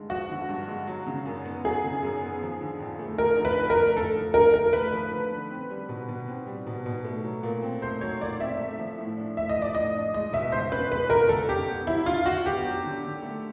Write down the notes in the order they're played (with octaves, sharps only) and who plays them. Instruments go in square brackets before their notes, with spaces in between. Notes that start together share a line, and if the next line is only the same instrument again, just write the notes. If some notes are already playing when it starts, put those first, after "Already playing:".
Already playing: [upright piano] G2 D3 G#3
[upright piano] F3 [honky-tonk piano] F#4
[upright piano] D3
G2
G#3
F#3
C#3
F#2
B3
[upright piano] F#3 [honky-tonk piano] G#4
[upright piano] C#3
F#2
B3
F3
D3
F2
A3
[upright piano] F3 [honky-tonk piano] A#4
[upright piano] D3
[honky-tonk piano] B4
[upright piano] F2
[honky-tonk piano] A#4
[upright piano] A3
[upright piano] A3 [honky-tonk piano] A4
[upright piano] F3
[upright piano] D3 [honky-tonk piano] A#4
[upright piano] D3 [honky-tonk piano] A#4
[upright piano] A3 [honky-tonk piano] B4
[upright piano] F3
D3
D3
C4
G3
B2
B2
C4
G3
B2
B2
A3
F#3
A#2
C4
[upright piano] A3 [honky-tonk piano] C5
[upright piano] F#3 [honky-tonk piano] C#5
[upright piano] A#2 [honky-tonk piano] D5
[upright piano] C4 [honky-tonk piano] E5
[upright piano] A3
F3
A2
D4
[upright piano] A3 [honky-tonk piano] E5
[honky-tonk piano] D#5
[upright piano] F3
[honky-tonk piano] D5
[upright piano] A2 [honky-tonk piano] D#5
[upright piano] D4
[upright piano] G#3 [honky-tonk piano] D#5
[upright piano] B2 [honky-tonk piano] E5
[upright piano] C#2 [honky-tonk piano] C5
[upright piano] C#4 [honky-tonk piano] B4
[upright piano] G#3 [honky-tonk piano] B4
[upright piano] B2 [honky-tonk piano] A#4
[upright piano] C#2 [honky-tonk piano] A4
[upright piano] C#4 [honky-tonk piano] G4
[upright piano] B3
[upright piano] F#3 [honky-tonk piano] E4
[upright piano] D3 [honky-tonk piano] F4
[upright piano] D3 [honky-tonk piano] F#4
[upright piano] B3 [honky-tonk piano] G4
[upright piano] F#3
D3
D3
A3